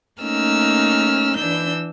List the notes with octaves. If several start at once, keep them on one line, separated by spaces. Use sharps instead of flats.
A3 A#3 C#4 D#4 E6 F6
E3 D4 E6 G6